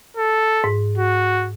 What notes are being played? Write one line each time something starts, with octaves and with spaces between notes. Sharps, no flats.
A4
G#2
F#4